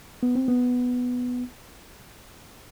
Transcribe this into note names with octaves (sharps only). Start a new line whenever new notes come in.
B3
C4
B3